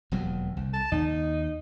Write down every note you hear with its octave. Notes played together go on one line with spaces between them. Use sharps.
E1 D#2 F#3
C2
A5
D#2 D#4